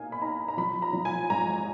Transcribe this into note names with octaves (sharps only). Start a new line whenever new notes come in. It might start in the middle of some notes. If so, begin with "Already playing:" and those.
Already playing: B2 A#3 D#4 F5 G#5
B5
D#4 A#5
A#5
F3 B5
A#5
F3
G#5
G#2 A#5